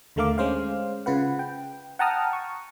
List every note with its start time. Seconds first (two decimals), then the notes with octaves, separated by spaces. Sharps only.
0.16 D#2 D3 A3 A#4 F5 D6
0.38 G#3 C#4 C5 F5
1.06 C#3 F4 B4 F#5
1.39 G5
1.99 F#5 G5 A5 A#5 D#6 F6
2.33 C#6